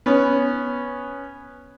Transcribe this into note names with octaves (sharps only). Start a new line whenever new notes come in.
B3 C#4